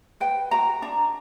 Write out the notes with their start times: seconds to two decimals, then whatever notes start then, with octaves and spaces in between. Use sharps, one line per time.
0.20 B4 G5
0.51 F#4 A#5
0.82 D4 A#5